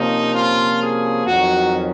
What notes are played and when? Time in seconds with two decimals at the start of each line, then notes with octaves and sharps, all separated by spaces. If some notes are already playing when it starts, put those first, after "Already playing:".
Already playing: C3 F3 A#3 C#4 D#4
0.34 F4
0.81 G#4
1.26 F2 D#3 F#3 C#4 F#4